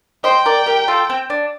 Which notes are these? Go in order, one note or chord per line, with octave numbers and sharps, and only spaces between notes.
C5 D#5 G5
A#4 D5
G4 A#4
F4 A4
C4
D4